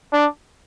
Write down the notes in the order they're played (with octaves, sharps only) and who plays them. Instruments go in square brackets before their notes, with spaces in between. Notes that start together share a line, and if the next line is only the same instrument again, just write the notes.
[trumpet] D4